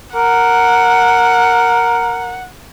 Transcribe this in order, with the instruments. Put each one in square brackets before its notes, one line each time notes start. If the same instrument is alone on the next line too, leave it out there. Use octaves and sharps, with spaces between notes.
[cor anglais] A#4 [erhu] F#5